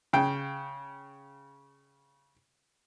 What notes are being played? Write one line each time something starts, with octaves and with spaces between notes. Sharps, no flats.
C#3 G5